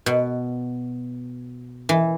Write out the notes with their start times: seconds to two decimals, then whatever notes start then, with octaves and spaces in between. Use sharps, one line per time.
0.06 B2
1.89 E3